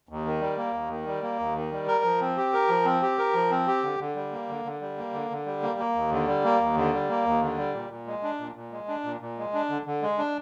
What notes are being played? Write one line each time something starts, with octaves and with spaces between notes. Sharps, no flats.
D#2
D#3
G3
A#3
D#2
D#3
G3
A#3
D#2
D#3
G3
A#4
F3
C4
G4
A#4
F3
C4
G4
A#4
F3
C4
G4
D3
D3
G3
A#3
D3
D3
G3
A#3
D3
D3
G3
A#3
A#3
D#2
D3
G3
A#3
D#2
D3
G3
A#3
D#2
D3
G3
A#2
A#2
G#3
D4
A#2
A#2
G#3
D4
A#2
A#2
G#3
D4
D3
D3
G#3
D4